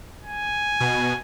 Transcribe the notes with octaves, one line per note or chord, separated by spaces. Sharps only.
G#5
B2